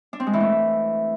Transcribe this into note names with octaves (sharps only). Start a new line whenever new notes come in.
D4
C4
G#3
E3
A3